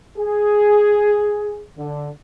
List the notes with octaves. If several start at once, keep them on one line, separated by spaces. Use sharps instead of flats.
G#4
D3